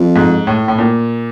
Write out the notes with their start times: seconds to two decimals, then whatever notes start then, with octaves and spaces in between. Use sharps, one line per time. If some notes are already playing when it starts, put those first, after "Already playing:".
Already playing: F2
0.16 G#2
0.47 A2
0.68 A2
0.78 A#2